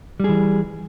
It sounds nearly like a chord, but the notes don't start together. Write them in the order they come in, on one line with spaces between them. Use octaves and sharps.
G3 G#4 E3